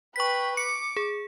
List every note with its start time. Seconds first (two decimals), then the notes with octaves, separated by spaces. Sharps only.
0.16 B4 G5 C#6 B6
0.57 D6 C#7
0.96 G#4